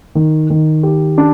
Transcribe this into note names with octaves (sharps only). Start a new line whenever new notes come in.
D#3
D#3
G4
D4